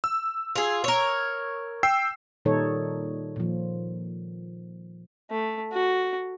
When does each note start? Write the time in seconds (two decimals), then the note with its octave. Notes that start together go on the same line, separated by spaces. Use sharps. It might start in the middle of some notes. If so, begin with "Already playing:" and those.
0.04 E6
0.56 F4 G#4
0.84 A#4 C#5
1.83 G5 E6 C7
2.45 A#2 D#3 G3 D#4 A4 C#5
3.36 A#2 F3
5.30 A3
5.72 F#4